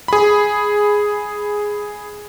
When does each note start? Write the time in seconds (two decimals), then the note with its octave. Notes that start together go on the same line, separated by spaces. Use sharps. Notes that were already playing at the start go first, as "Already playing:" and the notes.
0.08 G#4 B5